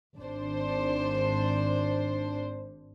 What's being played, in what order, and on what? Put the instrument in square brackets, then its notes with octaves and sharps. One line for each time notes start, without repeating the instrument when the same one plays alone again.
[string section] G#1 D4 C5